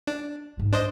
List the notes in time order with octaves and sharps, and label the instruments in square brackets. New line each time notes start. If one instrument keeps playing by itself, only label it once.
[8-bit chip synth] D4
[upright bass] G#2 F4
[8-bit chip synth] D4 C5 D#5